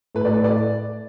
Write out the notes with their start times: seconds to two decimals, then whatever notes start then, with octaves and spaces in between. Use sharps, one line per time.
0.15 A2 B4
0.25 D5
0.33 B4
0.44 D5